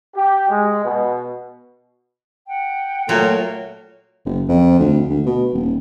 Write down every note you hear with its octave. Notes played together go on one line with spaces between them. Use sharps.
G4
G#3
B2
F#5 G5
A#2 F#3 A3
F#1
F2
D2
D2
B2
D#1